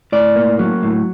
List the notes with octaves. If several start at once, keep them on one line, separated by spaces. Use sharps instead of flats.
A2 D5
A#3
F#3
A2